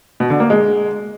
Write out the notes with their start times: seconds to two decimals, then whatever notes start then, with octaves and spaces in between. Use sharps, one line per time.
0.20 B2
0.30 D3
0.40 A#3
0.50 G#3